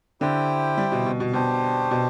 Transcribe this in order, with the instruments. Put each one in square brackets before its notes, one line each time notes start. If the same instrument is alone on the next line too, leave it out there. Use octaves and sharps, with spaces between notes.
[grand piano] D3 [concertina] E4 G4 C5 G5
[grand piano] G3
B2
B2
B2
[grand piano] B2 [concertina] D4 G4 C5
[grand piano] B2